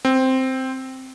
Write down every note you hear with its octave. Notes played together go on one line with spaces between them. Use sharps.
C4